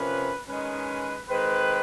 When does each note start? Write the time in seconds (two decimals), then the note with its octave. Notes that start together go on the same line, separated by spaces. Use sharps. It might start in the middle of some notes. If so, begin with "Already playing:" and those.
Already playing: C3 F3 A#3 C#4 B4
0.48 D#3 G#3 C#4 B4
1.29 D#3 G#3 C4 B4